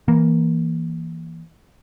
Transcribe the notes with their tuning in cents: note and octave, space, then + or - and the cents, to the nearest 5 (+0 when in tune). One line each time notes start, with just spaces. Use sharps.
E3 +0 A#3 +0